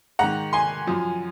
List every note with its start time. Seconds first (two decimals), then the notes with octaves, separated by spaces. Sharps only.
0.19 G#2 D#3 F#5 A#5
0.53 G#5 C6
0.87 F#2 F3